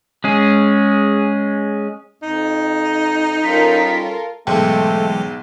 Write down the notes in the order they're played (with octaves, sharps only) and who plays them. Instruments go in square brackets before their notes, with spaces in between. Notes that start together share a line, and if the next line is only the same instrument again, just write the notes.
[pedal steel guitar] G#3 C#4 G#4
[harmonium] F2 [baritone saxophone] D#4
[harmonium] G3 C#4 [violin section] F4 A4 A#4 [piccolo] B6
[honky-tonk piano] B1 G#2 [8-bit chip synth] E3 F#3 G#3 [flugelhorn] A3 [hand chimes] G5